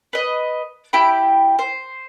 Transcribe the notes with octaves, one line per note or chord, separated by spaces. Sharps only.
B4 D#5
E4 G4 G5 B5
C5